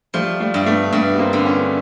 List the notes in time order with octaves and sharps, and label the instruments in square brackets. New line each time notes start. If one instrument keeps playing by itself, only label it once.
[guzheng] F3 [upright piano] G3 A3
[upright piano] G3 A3
[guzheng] G2
[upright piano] A3 B3
[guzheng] G2 [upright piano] A3 B3
[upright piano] B3
A#3 C4
[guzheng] D3
[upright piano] B3 C#4